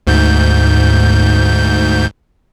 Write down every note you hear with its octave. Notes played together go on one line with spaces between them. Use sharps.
D2 G#2 G6